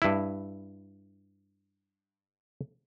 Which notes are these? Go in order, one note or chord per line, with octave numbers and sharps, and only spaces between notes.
G2 E4